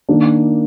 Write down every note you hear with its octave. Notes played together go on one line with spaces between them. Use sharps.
D#3 A#3 D4